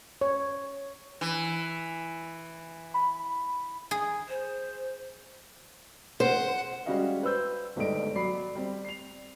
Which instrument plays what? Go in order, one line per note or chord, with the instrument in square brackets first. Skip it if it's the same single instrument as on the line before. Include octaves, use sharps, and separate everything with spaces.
[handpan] C#5
[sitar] E3
[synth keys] B5
[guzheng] G#4
[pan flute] C5
[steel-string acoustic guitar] C5 [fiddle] F#5
[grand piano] G3 G#3 C#4 F#4 D#5 F5
B4 C5 E6 G6
G1 G#2 G3 A3 D#5 D7
F#3 D5 B5 C7
G3 C4
C7 F7